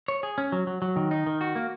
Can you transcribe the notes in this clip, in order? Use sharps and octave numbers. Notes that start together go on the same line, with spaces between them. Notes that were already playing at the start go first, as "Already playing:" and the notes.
C#5
G#4
C#4
F#3
F#3
F#3
D#3
D#4
D#3
F#4
A#3